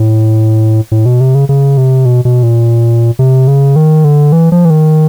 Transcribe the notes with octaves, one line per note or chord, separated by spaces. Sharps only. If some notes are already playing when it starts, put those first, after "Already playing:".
Already playing: A2
A2
B2
C3
C#3
C#3
C3
B2
B2
A#2
C3
C#3
D#3
D3
E3
F3
E3
D#3